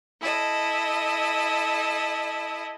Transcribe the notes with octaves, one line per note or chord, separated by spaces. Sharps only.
E4 A4 D#5